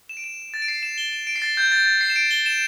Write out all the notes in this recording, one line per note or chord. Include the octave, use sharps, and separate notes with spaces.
E7
D7
E7
A6
D7
C7
E7
G7
E7
D7
C7
A6
G6
A6
A6
C7
E7
D7
G7
E7